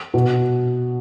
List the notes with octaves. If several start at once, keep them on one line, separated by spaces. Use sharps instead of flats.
B2